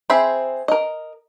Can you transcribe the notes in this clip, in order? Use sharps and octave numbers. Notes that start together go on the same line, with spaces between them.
C4 G#4 C5 E5 B5
A#4 D#5